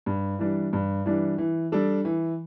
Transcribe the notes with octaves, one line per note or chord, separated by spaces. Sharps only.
G2
E3 G3 D4
G2
E3 G3 D4
E3
G3 D4 A4
E3